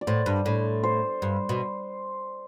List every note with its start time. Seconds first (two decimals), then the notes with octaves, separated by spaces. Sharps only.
0.01 D5
0.07 A2 C5
0.26 G2
0.46 A2
0.83 C5
1.22 G2
1.49 B2